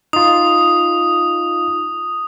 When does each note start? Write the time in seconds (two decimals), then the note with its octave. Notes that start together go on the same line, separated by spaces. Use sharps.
0.13 D#4 F4 D#6